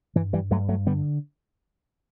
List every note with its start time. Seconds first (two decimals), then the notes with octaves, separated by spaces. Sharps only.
0.16 G2 E3
0.33 E3 G3
0.50 G2 F#3 A3
0.69 F#3 A3
0.86 D3 G3 B3